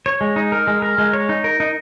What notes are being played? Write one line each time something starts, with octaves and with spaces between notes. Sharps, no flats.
C#5
G#3
D#4
A#4
G#3
A#4
G#3
C#5
D#4
A#4
D#4